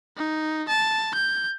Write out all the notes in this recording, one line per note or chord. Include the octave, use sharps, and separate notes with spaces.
D#4
A5
G6